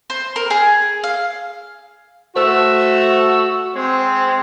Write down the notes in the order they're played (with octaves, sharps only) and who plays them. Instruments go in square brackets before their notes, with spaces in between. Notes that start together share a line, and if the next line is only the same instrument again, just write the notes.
[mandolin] C5
A#4
G#4
F5
[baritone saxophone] A3 [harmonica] F#4 [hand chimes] C5 [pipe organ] E6
[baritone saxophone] G#3 [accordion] C4 [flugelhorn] C5